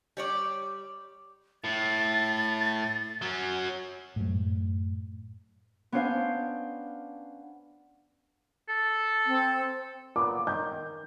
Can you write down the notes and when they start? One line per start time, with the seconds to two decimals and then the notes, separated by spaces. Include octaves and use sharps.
0.17 G3 C#5 D5
1.64 A2 A6
3.22 F#3 C#4
4.16 F#2 A2
5.92 B3 C#4 D4 C5 F5
8.69 A4
9.26 C4
10.16 A#2 B3 D6
10.47 D#3 G6